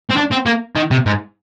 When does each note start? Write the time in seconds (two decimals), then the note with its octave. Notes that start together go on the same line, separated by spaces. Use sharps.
0.10 C4
0.16 D4
0.31 C4
0.46 A#3
0.76 D#3
0.91 C3
1.06 G#2